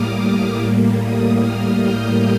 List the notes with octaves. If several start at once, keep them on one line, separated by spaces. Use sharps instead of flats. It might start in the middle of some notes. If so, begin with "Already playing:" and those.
Already playing: A2 G3 A#3 D6 D#6 F6
D6
A2 G3 A#3
D#6
F6
G6